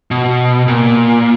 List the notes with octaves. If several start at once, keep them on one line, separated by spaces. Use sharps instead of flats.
B2
A#2